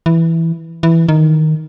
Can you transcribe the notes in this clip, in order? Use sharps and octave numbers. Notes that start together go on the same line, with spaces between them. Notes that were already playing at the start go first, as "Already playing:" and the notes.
E3
E3
D#3